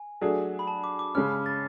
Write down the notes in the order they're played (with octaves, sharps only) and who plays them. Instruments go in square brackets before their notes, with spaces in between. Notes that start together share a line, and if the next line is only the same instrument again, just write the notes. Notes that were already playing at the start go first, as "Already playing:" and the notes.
Already playing: [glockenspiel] G#5
[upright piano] F#3 A3 D4 G#4
[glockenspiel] B5
A5
D6
D6
[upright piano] C#3 G#3 C#4 [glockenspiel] F6
[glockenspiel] A6